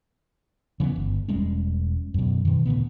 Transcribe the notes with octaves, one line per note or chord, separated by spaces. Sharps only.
C#3 E3 G3 B3
G1
E1 G3 G#3 C#4
F#2 B2
B2 D#3
D2 A#2 C#3 B3